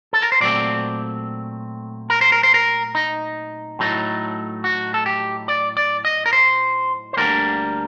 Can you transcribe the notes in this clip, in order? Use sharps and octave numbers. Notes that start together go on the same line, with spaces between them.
A4
A#4
C5
A#2 F#3 A3 C4 D5
A#4
C5
A#4
C5
A#4
D#4
A2 F#3 A3 D#4
F#4
A4
G4
D5
D5
D#5
A#4
C5
C5
D2 D3 G3 A#3 A#4